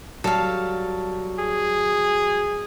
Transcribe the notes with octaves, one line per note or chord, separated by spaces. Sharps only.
F#3 G3 A4 F5
G#4